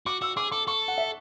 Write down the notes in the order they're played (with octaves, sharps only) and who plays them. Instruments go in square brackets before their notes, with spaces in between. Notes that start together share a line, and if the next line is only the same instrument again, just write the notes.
[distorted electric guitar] F#4 [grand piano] D6
[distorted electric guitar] F#4 [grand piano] E6
[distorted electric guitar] G#4 [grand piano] D6
[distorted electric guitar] A4 [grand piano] D6
[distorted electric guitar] A4 [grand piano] C#6
[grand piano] F#5
E5